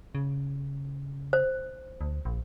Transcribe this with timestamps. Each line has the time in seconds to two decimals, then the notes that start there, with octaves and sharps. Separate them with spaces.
0.15 C#3
1.33 C5
2.01 D2
2.25 A#1